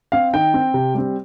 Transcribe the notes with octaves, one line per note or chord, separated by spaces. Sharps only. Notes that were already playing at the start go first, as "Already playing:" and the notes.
C4 F5
D#3 G5
C4
C3
G3 C4